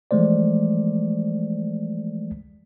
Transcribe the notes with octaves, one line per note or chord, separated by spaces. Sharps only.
E3 F3 G#3 A3 C5 D5